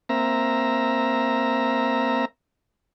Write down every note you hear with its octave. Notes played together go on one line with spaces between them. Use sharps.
A#3 C4 E5 A#5